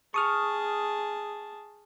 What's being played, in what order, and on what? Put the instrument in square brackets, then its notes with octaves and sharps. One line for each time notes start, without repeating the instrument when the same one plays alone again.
[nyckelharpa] G#4 A5 [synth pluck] C#6 D#6 F6